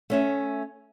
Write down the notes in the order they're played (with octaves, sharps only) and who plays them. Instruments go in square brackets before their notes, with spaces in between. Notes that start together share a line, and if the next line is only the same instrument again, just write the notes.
[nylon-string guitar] A3 C#4 E5